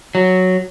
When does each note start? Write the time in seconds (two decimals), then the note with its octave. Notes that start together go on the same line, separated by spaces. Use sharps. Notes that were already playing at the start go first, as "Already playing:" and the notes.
0.15 F#3